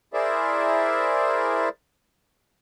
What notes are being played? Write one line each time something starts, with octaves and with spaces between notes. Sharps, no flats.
E4 G#4 A#4 C5 D5 E5